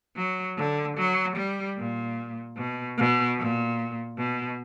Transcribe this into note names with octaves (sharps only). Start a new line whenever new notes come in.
F#3
D3
F#3
G3
A#2
B2
B2
A#2
B2